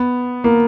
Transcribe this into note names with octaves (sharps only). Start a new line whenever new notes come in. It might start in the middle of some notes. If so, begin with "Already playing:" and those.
Already playing: B3
A#3